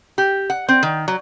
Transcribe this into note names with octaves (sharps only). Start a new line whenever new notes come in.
G4
F#5
C4
D#3
F#3